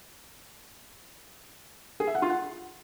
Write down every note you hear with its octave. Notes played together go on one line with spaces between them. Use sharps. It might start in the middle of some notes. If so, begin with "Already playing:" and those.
G#4
E5
F#5
F4
F#5